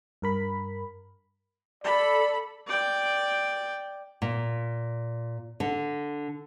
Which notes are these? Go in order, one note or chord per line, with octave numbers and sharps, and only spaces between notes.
G2 A#4 B5
A4 D5 B5
D5 G5
A#2
D3